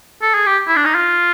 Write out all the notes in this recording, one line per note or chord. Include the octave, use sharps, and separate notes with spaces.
A4
G#4
G4
E4
D4
D#4
F4